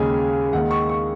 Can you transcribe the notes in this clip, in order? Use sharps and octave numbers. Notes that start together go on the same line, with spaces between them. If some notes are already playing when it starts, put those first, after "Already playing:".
Already playing: D#2 C#3 G#3 G#5
D#2 D#3 G#3 F#5
C#6
C#6